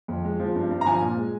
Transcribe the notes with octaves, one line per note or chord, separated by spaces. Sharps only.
F2
G#3
F3
G2
G2
A#5
F3 G#5
A#2
G#3